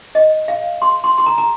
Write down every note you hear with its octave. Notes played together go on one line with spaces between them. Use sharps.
D#5
F5
C6
C6
C6
A#5
A#5